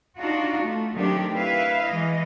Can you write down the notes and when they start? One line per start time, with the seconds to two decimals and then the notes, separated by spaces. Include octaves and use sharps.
0.18 D4 D#4 F4 F#4
0.62 A3
0.94 D#3 F#3 A3 C4 D4 G4
1.34 E4 B4 E5 F5
1.85 E3 G#3 D#5